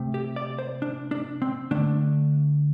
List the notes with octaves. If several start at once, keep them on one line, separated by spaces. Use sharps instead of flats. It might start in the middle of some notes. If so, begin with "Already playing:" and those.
Already playing: C3 A3
G4
D5
C5
D4
D4
C4
D3 A3 D4